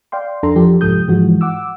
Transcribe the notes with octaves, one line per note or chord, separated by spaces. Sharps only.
D5 F5 G5 C6
F2 D4 A4 A#5 C6
F3 G4 A4
C2 G#2 F3 A4 D#6 G6
G#2 E3 F3 G#3 F#4
F#5 D6 E6